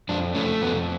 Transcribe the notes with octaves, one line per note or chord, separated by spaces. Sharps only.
F2 D4
A3 C#4
F2 B3